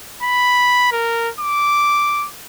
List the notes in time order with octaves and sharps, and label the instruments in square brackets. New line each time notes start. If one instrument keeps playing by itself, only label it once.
[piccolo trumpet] B5
A#4
D6